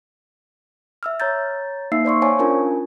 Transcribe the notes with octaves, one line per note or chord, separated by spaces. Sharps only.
E5 E6 F6
C#5 A#5 G6 A6
A#3 D#4 E5 F5 E6 C7
C5 D5 C6 C#6
C5 C#5 F5 G#5 A5 C#6
C#4 D4 F4 A#4 G#5 A5